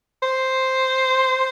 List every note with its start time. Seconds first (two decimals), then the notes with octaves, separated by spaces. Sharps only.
0.23 C5